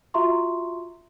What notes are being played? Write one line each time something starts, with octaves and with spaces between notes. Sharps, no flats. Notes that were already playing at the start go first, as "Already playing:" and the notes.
F4 F#4 E5 A#5 C6 C#6